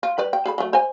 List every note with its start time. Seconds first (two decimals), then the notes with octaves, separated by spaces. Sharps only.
0.03 F4
0.18 G3 B4 D5
0.33 G5
0.46 G#4 A4 B5
0.58 F#3 A3
0.73 C5 D#5 G#5